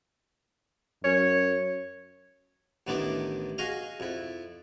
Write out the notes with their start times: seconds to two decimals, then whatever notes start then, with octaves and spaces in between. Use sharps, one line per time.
1.04 F#2 C#5
2.87 A1 D#3 B3 D4 E4 D6
3.58 F#4 G#4 D#5 F5
4.00 F2 E4